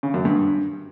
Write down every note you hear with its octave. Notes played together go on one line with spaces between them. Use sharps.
C#3
F#2
G2